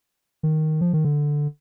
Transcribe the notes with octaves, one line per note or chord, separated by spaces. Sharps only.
D#3
F3
D#3
D3